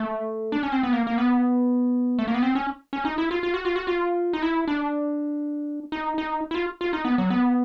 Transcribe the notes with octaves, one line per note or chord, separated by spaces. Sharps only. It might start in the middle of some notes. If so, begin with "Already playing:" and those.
Already playing: A3
D4
C#4
C4
B3
A#3
A#3
B3
A3
A#3
B3
C4
C#4
C#4
D#4
E4
F4
F4
F#4
F4
F#4
F4
D#4
E4
D4
D#4
D#4
E4
F4
F4
D#4
B3
F#3
B3